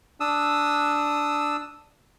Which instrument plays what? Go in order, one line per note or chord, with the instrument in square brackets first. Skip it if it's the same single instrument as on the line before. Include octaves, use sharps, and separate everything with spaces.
[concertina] D4 D#6 E6